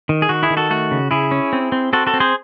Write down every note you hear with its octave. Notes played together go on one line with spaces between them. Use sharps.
D#3
G#4
D#3 F#4
E4 G#4
D#3
F#4 A4
A3 F#4
C#3
C#3 E4 G#4
C#4
C4
C4
C4 F#4 A4
F#4 A4
C4
G#4 C5